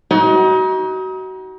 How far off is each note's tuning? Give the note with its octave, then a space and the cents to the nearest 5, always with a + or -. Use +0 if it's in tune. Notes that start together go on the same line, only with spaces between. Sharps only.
D#4 +35 F#4 +30